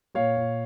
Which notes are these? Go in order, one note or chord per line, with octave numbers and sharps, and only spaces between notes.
A#2 C#5 F5
A#2